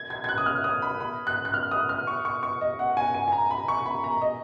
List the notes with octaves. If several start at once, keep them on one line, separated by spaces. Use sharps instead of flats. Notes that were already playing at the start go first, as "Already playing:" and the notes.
Already playing: G#6
G#6
G#6
F#6
D#6
F6
D#6
B5
B5
F#6
F#6
F6
D#6
F6
C#6
C#6
C#6
D#5
F#5
G#5
G#5
G#5
A#5
B5
C#6
B5
A#5
D#5